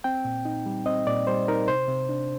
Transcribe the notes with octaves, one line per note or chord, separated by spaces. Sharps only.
C4 G5
A#2
D#4
G3
C4 D#5
A#2 D5
G3 C5
D#4 A#4
C3 C5
C3
D4